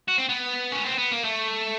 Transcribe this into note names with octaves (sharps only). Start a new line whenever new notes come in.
F#4
C4
B3
C#4
C4
B3
A#3
A3